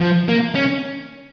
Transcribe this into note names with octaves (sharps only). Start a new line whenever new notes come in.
F3
A#3
C#4